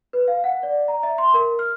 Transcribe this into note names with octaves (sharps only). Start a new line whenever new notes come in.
B4
F5
F#5
D5
A#5
E5
C6
A#4
F6